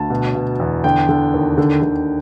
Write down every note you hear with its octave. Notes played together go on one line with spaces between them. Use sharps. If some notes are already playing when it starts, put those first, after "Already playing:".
Already playing: D2 A5
B2
B2
E2
D3 G5
D3
D#2
D3
D3